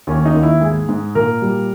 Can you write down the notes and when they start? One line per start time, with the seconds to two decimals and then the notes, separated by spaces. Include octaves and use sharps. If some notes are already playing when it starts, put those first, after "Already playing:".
0.07 D#2 C#4
0.26 D#4
0.35 D#2
0.43 E4
0.61 G#2 G#4
0.89 G#2
1.15 A#2 A#4
1.42 G3